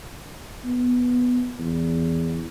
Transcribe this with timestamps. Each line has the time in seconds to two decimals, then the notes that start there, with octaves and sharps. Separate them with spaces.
0.65 B3
1.59 E2